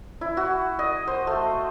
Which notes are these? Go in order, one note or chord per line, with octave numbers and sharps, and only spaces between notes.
E4
F#4
D#5
C5
A3